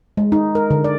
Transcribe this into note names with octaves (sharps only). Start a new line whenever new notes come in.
G#3
D#4
A#4
D3
D5